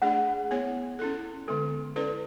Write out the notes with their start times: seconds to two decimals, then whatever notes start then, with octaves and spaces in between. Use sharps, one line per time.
0.02 A3 D4 G#4 D5 F#5
0.51 B3 E4 G#4 C#5
0.99 C#4 E4 A4
1.48 D3 G#3 B3 A4
1.96 C#4 E4 A4 B4 D5